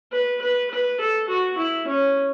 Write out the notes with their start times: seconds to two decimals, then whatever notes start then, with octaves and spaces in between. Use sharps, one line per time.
0.12 B4
0.41 B4
0.71 B4
1.00 A4
1.29 F#4
1.58 E4
1.87 C#4